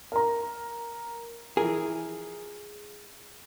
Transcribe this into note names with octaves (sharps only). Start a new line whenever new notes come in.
A#4 A#5
E3 F3 G#4 A#4